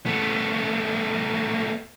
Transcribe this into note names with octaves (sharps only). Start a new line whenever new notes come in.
A3 B3